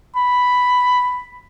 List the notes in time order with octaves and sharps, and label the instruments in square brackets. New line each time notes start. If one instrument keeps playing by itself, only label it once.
[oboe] B5